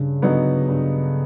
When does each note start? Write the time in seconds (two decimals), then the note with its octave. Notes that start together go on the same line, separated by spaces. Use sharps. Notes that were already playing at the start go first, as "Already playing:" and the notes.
Already playing: G2 C#3
0.22 D3 F#3 B3 D#4
0.69 G2